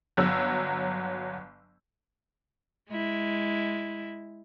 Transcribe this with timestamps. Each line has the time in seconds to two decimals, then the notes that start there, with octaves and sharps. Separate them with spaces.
0.17 G1 F#3 E6
2.90 G#3 E4